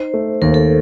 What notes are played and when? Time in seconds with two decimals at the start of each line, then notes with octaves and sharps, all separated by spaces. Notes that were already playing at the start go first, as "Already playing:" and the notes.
Already playing: D#4 C5
0.14 A3
0.42 D#2 A#4
0.54 A4